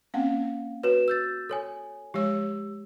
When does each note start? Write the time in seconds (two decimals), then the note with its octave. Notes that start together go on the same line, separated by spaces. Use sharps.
0.14 A#3 C4 C#4 F5 F#5
0.83 F#4 B4 C#5 E7
1.08 E6 G6 A6
1.49 A4 C#5 G#5
2.14 F3 G#3 G4 C#5 E6